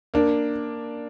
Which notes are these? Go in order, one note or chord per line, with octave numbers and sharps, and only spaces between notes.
A#3 D4